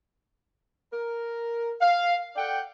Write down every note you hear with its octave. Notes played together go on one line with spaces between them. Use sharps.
A#4
F5
A4 D5 F#5 G5